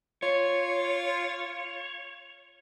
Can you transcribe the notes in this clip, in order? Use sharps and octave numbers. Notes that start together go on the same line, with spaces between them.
F4 C#5